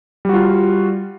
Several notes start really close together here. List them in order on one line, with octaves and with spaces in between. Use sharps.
G3 F#4 F4